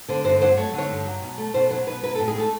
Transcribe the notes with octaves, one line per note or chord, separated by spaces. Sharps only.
D3 C5
G2 C5
F#3 C5
A3 C#5
D3 C#5
G2
F#3
B2
A3
B2 C5
F#3 C5
B2 B4
F#3 B4
A4
A2
G#4
A3 A4